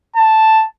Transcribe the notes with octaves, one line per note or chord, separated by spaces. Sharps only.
A5